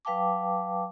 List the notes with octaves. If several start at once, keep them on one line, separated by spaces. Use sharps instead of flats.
F#3 B4 F5 G5 A5 D6